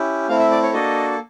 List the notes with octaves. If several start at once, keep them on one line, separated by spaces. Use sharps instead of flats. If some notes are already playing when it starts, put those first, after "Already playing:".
Already playing: C#4 E4 G4
A3 C4 E4 F5
E5
D5
C#5
A#3 D4 F#4 A4 D#5